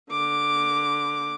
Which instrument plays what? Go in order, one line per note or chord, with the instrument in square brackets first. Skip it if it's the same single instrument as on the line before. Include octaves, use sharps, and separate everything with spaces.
[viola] D3 D6